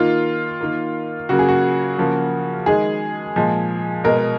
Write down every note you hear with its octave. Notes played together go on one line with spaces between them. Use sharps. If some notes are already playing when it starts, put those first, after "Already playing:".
Already playing: D#3 A#3 F4
D#3 A#3
C#3 F#3 A#3 F#4
G#4
F#4
C#3 F3 A#3
D#3 G#3 G#4
A#2 F3 G#3
B2 G#3 A#4